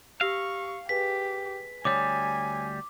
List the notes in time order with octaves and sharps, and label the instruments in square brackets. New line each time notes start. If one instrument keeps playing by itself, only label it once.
[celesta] G4 E6 A#6 [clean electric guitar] F5 [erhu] C#6
[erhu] G4 [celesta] G#4 B4 G#5 [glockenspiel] B6
[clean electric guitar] D2 G3 [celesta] C#5 D#6 [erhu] G#5 [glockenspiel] D6